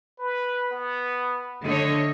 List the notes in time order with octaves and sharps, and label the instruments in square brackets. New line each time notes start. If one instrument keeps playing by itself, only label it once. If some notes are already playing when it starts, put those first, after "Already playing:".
[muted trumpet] B4
B3
[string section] D3 A3 C#5 [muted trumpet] D#5